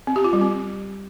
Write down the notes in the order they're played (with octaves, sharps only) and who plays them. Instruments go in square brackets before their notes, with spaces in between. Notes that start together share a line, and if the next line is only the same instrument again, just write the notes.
[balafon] C4
G4
F4
G3
C4